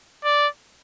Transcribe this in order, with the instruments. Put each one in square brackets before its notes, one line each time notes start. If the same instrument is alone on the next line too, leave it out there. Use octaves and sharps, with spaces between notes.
[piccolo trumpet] D5